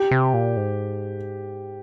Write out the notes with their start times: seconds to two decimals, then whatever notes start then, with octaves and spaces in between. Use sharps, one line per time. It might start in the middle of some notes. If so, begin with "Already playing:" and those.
Already playing: G4
0.11 C3
0.34 A#2
0.57 G#2